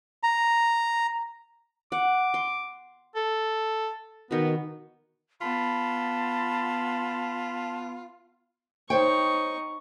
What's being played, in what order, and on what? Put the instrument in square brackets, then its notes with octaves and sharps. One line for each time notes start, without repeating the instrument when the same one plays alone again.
[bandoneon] A#5
[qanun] F#5 [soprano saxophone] D6
[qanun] C6
[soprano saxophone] A4
[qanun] B2 D#3 [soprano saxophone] B3
[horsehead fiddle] B3 [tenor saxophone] F4 [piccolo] A5 [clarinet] B5
[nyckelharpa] D#4 C#6 [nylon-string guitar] C5 C#5 G5